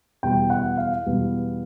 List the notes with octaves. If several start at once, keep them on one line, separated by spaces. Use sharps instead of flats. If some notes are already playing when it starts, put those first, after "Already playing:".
E2 B2 G3 B3 G5
F#5
F5
E2 B2 G3 B3